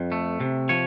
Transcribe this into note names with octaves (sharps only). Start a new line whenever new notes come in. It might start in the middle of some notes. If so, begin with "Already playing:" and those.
Already playing: F2
A3
C3
F3 C#5